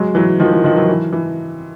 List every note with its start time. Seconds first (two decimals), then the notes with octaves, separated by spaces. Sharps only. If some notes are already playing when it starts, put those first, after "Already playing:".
Already playing: F#3 G#3
0.15 E3 F#3
0.40 D#3 F3
0.52 E3
0.64 D#3 F3
0.76 E3 F#3
0.89 E3
1.13 E3